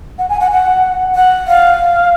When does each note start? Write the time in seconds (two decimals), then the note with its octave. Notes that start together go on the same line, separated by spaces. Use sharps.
0.18 F#5
0.29 G#5
0.40 F#5
0.51 F#5
1.15 F#5
1.48 F5